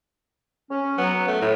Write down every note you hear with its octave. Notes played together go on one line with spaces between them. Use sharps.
C#4
F#3 B3
A3
A2 E4